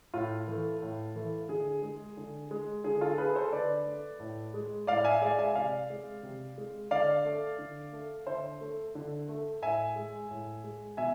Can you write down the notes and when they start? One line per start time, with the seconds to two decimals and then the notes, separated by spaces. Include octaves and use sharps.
0.14 A2 F4
0.48 E3 A3
0.82 A2
1.15 E3 A3
1.49 D3 G#4
1.83 G#3
2.17 D3
2.51 G#3
2.84 D3 G#4
3.01 F4 A4
3.18 A3 G#4 B4
3.35 A4 C5
3.53 D3 B4 D5
3.87 A3
4.20 A2
4.54 G#3
4.87 A2 D5 F5
5.04 E5 G#5
5.22 G#3 D5 F5
5.38 E5 G#5
5.55 C3 D5 F5
5.90 G#3
6.23 C3
6.58 G#3
6.91 D3 D5 F5
7.25 A3
7.58 D3
7.93 A3
8.26 D3 C5 E5
8.61 A3
8.95 D3
9.28 A3
9.62 A2 E5 G#5
9.96 G#3
10.30 A2
10.64 G#3
10.97 B2 E5 G#5